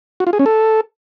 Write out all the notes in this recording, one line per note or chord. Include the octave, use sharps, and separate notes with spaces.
F#4
F4
G#4
C#4
A4